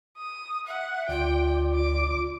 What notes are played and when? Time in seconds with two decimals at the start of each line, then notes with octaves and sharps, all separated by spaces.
0.18 D#6
0.67 E5 F#5
1.09 D2 F4 D5 G5
1.75 D6